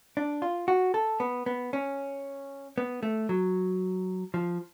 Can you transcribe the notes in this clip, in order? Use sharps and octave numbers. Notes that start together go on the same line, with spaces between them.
D4
F4
F#4
A4
B3
B3
C#4
B3
A3
F#3
F3